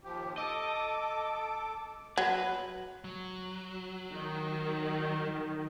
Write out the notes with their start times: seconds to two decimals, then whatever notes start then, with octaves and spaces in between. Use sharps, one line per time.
0.04 D#2 F3 G4
0.38 A4 D#5 D6
2.18 F#3 B4
3.04 F#3
4.12 D#3